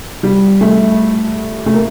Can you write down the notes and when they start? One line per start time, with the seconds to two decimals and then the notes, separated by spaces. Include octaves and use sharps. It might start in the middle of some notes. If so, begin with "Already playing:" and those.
0.23 G3
0.61 A3
1.66 A3
1.74 A#3